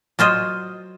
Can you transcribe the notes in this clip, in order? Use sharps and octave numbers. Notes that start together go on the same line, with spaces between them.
F#3 F4 C5 D#5